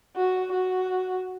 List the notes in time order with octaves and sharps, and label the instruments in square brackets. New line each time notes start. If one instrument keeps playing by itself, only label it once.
[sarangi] F#4
F#4